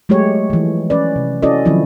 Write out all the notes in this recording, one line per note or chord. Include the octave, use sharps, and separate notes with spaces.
F#3 G#3 A3 G4 C#5
E3 F3
C#4 B4 D5
C3
C#4 E4 F#4 A4 D5 D#5
D#3 F3 F#3 C4 E4